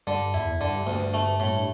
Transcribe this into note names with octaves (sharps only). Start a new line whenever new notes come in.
G2 D3
E2 E4
E2
G2 D3
D2 G2
A3
A2